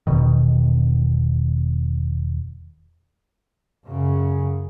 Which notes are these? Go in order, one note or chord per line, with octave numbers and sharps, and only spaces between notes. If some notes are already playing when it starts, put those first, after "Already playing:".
E1 B2 D#3
F#2 C#3